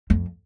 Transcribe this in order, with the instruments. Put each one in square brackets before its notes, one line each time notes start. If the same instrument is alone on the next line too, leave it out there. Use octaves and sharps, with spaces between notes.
[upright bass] F2